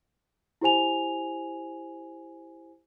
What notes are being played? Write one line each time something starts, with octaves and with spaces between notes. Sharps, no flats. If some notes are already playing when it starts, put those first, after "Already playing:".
E4 G4 C5 G#5 F7